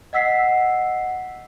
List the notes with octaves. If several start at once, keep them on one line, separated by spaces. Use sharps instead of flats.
D#5 F#5 E6 B6 C7